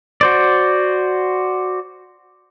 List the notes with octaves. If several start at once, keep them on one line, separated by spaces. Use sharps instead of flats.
F#4 C5 D5